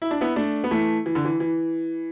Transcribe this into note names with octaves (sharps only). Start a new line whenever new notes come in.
E4
D4
B3 E4
A3 D4
B3
E3 A3
E3
D3
E3
E3